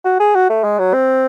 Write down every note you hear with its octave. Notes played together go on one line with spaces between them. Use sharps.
F#4
G#4
F#4
A3
G#3
F#3
C4